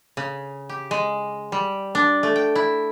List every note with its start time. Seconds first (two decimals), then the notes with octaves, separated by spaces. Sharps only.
0.17 C#3
0.69 G4
0.91 G#3
1.52 G3
1.95 D4
2.23 A3
2.36 G5
2.55 E4